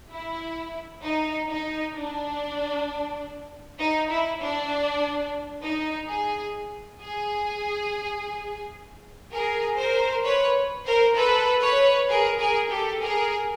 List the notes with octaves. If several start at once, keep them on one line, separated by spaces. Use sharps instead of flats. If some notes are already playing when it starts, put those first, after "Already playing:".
E4
D#4
D#4
D4
D#4
E4
D4
D#4
G#4
G#4
G#4 A#4
A#4 C5
B4 C#5
A#4 C5
A4 B4
B4 C#5
G#4 A#4
G#4 A#4
G4 A4
G#4 A#4